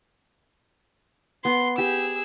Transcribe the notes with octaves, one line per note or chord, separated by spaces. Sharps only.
B3 C6
G4 G#4 E6